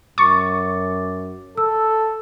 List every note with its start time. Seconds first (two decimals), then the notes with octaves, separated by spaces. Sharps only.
0.18 F#2 C#6 D6 A6
1.58 A4 E6